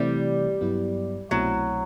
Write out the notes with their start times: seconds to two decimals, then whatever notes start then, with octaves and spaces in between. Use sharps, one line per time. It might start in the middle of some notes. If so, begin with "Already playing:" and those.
Already playing: C3 E3 G3 A3 C4 E4
0.61 G2 F#3 B3 E4
1.31 C2 B2 F#3 A3 C4 E4